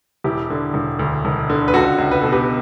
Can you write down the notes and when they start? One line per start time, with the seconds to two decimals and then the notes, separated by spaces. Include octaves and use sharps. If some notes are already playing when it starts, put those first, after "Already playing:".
0.24 E1 E4 G4
0.50 D3
0.74 E1
0.99 D2
1.25 E1
1.50 D3
1.68 B4
1.74 C#2 F#4 A4
1.98 C#2
2.11 B4
2.22 B2 A4
2.32 G4 B4